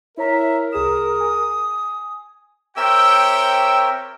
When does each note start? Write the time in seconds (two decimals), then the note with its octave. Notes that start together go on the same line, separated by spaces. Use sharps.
0.17 E4 A#4 C#5 E5 A#5
0.72 C2 G#4 D#6 E7
1.20 G#5
2.77 C4 G4 A#4 C#5 E5 G5 E6